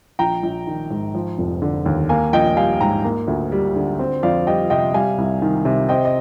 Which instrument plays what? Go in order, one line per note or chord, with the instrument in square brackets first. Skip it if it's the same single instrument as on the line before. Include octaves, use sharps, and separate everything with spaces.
[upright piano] A#1 G5 A#5
A#1
D#3
G#2
F3
F1
D3
D#2
A#3 F5 G#5
A#1 D#5 G5
G3 F5 G#5
G#2 G5 A#5
A#3
D2
G3
D3
C4
F2 D5 F5
G3 D#5 G5
C3 D#5 G5
G3 F5 G#5
C2
D#3
C3
C4 D#5 G5
D#5